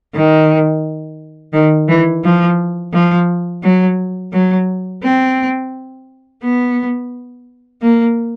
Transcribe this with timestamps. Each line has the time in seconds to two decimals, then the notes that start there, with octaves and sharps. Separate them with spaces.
0.14 D#3
1.53 D#3
1.88 E3
2.24 F3
2.93 F3
3.63 F#3
4.32 F#3
5.03 C4
6.43 B3
7.82 A#3